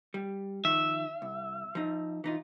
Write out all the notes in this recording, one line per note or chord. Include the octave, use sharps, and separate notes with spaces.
G3
D#3 F3 E5
C2
F3 D#4
E3 D#4 F4